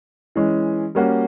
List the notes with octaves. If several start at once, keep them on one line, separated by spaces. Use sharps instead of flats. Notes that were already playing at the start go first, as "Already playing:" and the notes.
E3 G#3 C#4
G3 A#3 C#4 F#4